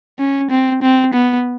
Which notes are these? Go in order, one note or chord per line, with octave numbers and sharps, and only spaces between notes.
C#4
C4
C4
B3